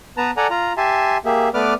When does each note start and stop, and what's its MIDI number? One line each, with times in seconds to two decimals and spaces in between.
0.17 0.31 59
0.17 0.31 71
0.17 0.31 81
0.17 0.31 82
0.37 0.47 69
0.37 0.47 74
0.37 0.47 78
0.37 0.47 80
0.37 0.47 82
0.50 0.73 65
0.50 0.73 82
0.77 1.17 67
0.77 1.17 76
0.77 1.17 80
0.77 1.17 81
0.77 1.17 84
1.25 1.49 58
1.25 1.49 67
1.25 1.49 68
1.25 1.49 76
1.54 1.74 57
1.54 1.74 59
1.54 1.74 71
1.54 1.74 74
1.54 1.74 86
1.54 1.74 89